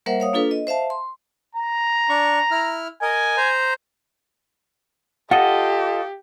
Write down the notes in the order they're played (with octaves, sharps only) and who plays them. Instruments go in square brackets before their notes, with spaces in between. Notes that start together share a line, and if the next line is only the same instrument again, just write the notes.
[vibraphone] G3 A#3 A#4 C5 E5 F#5
C#5 F5 D#6
A#3 D4 F4 A4 B4
D#5
C5 E5 F5 A5
C6
[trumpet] A#5
[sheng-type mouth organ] D4 C#6
E4 F6
[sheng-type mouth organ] A#4 D#5 [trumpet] G#5
[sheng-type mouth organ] C5 A#5
[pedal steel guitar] F4 A4 D#5 [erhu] G4 [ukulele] F#5